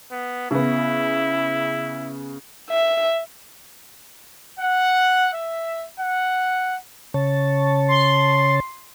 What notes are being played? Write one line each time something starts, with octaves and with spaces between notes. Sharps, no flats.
B3
C#3 B3 E4
E5
F#5
E5
F#5
C#3 C#5 A5
C6